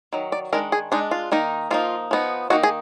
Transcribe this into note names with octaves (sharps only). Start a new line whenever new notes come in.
D#3 F#3
D5
D#3 G#3 D4 A#4
G#4
G#3 D4 D#4
F4
D#3 A#3 D#4
F3 A#3 D#4 F4
F3 B3 D#4
D#3 A#3 D#4 F#4
G#4